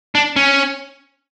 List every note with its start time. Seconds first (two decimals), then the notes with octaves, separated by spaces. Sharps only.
0.15 D4
0.36 C#4